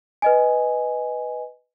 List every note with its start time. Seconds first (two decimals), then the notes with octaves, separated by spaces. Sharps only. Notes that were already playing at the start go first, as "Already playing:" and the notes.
0.22 B4 D#5 G#5